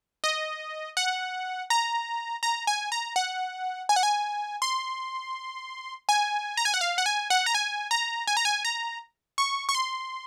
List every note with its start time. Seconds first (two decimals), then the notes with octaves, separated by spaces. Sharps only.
0.24 D#5
0.97 F#5
1.70 A#5
2.43 A#5
2.67 G#5
2.92 A#5
3.16 F#5
3.89 G#5
3.96 F#5
4.03 G#5
4.62 C6
6.09 G#5
6.57 A#5
6.65 G#5
6.74 F#5
6.81 F5
6.98 F#5
7.06 G#5
7.30 F#5
7.46 A#5
7.54 G#5
7.91 A#5
8.27 G#5
8.37 A#5
8.45 G#5
8.65 A#5
9.38 C#6
9.69 C#6
9.75 C6